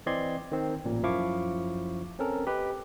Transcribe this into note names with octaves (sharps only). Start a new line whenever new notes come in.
E3 C4 D5 D#5 C6 G#6
D#3 C4
A1 A#2
F#2 F3 E4 F5 C#6 D6
C4 C#4 A4 A#4
G4 B4 D#5